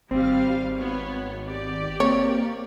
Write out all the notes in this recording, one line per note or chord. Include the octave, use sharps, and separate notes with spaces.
G#1 G3 C4 F5
B3 C#5
G4 D5
A#3 C4 C#5